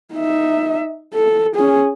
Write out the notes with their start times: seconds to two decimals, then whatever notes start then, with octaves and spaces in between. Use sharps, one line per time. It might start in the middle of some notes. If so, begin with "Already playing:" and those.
0.14 D#4 E5
1.14 A4
1.55 C#4 G#4